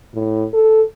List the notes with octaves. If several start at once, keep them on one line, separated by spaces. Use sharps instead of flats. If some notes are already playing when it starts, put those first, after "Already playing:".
A2
A4